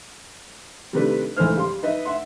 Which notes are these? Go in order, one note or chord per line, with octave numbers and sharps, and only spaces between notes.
C3 D#3 G3 A3 D4 B4
C#2 E3 A3 D#4 C5 F6
G3 F5 C6
D#4 B4 D#5 E5
E5 F#5 C6